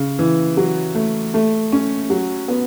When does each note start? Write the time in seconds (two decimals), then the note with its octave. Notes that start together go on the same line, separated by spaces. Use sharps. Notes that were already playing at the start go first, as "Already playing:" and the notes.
Already playing: C#3
0.19 E3
0.57 F#3
0.95 A3
1.34 A3
1.72 C#4
2.10 F#3
2.48 B3